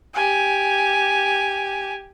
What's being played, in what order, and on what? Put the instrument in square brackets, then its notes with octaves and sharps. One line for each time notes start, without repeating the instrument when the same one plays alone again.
[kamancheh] G4 G#5